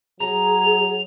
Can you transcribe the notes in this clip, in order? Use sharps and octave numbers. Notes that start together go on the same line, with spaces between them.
F#3 G#4 A#5 F7